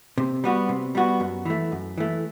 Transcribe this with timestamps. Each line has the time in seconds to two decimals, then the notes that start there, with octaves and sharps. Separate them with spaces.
0.18 C3
0.44 G3 B3 F#4
0.69 C3
0.95 G3 B3 F#4
1.20 F#2
1.45 E3 A3
1.72 F#2
1.98 E3 A3